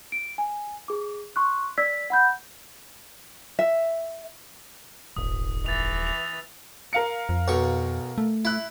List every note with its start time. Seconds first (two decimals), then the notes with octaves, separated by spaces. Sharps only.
0.12 D7
0.38 G#5
0.88 G#4 D6
1.36 C6 C#6 F#6
1.78 D5 E6 G#6 B6
2.10 F#5 B5 G6
3.59 E5
5.16 D#1 G#1 D#6
5.66 E3 A6 F7
6.07 F7
6.93 A#4 F5 C#7
7.29 F2
7.48 B1 B2 C#6
8.18 A3
8.45 E4 E5 F#6